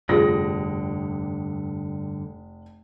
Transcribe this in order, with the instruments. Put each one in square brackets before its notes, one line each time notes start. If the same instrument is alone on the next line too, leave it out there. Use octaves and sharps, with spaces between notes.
[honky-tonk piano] F1 D#6 A#6 [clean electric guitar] G2 D3 [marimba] F4 G#4